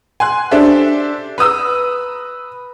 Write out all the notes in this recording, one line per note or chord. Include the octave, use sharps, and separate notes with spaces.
G#5 C6 F#6
D4 G4 A4 C5 D5 E5
B4 A#5 D#6 E6